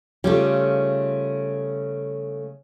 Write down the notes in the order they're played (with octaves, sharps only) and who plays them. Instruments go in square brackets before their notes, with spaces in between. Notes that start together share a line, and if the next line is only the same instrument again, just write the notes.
[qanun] C#3 F4 D6 [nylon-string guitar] G3 A3